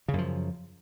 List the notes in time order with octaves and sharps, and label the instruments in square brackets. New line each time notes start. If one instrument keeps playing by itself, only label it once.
[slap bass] C#3
F#2
F3